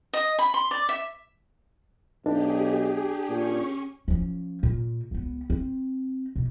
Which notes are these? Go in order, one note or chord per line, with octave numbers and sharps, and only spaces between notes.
D#5
B5
C6
D5
E5
B1 D4 G4 G#4
A#2 C#4 C#6
F3 C#4
A#2
C#2 B3
C4
B2